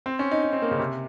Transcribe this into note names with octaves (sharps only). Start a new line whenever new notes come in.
C4
C#4
D#4
D#4
C4
A#3
C#3
C3